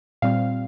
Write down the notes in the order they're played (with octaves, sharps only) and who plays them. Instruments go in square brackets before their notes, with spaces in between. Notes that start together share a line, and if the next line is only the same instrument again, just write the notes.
[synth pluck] A#2 G3 C4 F5